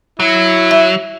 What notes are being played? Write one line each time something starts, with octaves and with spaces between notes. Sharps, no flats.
F#3 E4
E5